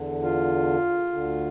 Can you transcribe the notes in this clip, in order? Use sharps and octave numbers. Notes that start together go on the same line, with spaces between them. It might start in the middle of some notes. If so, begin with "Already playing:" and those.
Already playing: E2 D3
F4
D2 D3